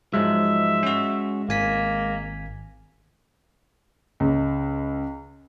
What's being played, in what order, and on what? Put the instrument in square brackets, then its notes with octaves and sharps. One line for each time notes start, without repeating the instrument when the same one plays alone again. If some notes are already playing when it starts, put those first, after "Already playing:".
[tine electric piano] G#2 F3 F#3 [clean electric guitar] G#3 [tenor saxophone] E5
[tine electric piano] C#4 F#4
[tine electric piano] G#1 G#5 B6 [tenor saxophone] A#3
[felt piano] C#2